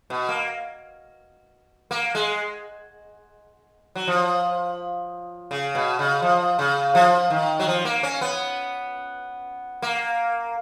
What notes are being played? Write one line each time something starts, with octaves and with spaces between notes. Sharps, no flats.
B2
A#3
A#3
G#3
F#3
F3
C#3
B2
C#3
F3
C#3
F3
D#3
F#3
F3
A#3
C#4
B3
A#3